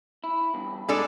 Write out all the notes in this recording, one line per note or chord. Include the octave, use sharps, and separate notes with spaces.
E4
E2 G2
G#3 D4 G#4 A4